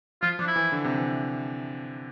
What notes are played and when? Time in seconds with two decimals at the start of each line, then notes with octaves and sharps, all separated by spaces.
0.22 F3 F4
0.39 F3 D4
0.48 E4
0.56 E3
0.72 D3
0.84 C3
0.97 E3